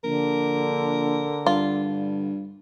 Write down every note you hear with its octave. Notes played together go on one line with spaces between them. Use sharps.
A#1 D3 A#4
G2 F4